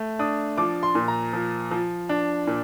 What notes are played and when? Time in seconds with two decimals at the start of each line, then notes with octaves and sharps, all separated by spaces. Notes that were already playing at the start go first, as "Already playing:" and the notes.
Already playing: A3
0.19 D4 D#6
0.58 F3 D6
0.83 C6
0.95 A#2
1.08 A#5
1.33 F3
1.71 F3
2.09 D4
2.47 A#2